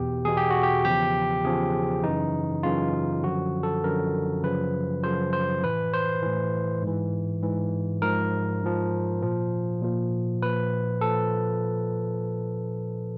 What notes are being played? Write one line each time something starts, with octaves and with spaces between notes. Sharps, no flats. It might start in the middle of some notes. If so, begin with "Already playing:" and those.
Already playing: E2 B2 G4
E2 B2 G#4
G4
F#4
G4
E2 C#3 F3 G4
E2 C#3 F3 G#4
F#2 C#3 E3 D#4
F#2 C#3 E3 F4
F#2 D3 F3 F#4
A4
F#2 D3 F3 A#4
F#2 C#3 F3 B4
F#2 C#3 F3 C5
C5
A2 E3 B4
C5
A2 E3
G#2 E3
G#2 E3
G#2 F3 A#4
G#2 F3
A#2 F3
A#2 F3
A#2 F3 B4
A#2 F3 A4